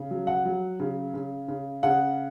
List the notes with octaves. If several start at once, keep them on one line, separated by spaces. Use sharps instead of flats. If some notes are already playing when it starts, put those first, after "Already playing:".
Already playing: C#3
F#3
F#5
F#3
C#3
C#3
C#3
C#3 F#5